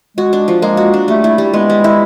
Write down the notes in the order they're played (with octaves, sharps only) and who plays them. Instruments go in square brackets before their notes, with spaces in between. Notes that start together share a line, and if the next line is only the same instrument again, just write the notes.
[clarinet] G#3 [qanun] F#4
[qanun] D4
F3
[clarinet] G#3 [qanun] A#3
[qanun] F#4
D4
[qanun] G3 [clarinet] A3
[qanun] E4
G3
[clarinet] G#3 [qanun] B3
[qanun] G3
E4